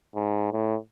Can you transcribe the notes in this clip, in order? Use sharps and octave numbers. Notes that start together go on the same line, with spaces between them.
G#2
A2